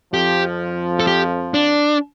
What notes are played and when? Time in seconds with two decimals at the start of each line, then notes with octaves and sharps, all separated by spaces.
0.13 F2 F3 G4
1.00 A4
1.07 G4
1.54 D4